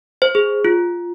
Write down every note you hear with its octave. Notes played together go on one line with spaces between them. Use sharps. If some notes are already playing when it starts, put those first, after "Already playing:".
C5
G#4
F4